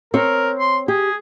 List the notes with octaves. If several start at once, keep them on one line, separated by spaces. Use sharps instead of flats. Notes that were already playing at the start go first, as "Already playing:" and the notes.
C4 A#4 C#5
C6
G4 G#4